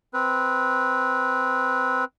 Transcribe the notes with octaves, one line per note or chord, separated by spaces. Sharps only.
C4 B4